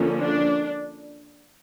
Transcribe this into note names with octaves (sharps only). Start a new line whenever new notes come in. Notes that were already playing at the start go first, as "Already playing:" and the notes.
Already playing: D3 F3 A#3 C#4
D4